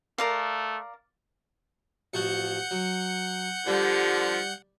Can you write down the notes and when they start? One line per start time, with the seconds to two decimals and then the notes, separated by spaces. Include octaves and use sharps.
0.18 A3 A#4 D5 F5
2.13 A1 F3 F#4 F#5 G6 C#7
2.71 F#3
3.67 D3 F3 G3